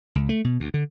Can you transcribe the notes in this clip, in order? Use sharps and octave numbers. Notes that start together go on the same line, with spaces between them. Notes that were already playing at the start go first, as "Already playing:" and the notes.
C#2
A3
B2
D2
D3